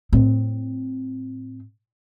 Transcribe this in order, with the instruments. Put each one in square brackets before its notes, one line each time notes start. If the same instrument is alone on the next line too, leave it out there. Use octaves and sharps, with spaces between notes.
[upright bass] A2 C4